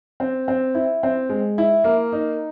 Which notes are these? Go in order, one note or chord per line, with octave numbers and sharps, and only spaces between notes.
C4
C4
E4
C4
G#3
E4
A#3
D#4